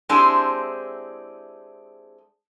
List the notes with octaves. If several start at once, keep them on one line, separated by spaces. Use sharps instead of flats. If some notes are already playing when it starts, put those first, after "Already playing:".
G#3 C4 D4 E4 G4 G#4